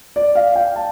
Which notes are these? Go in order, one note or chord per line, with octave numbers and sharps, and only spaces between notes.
D5
F5
G5
A5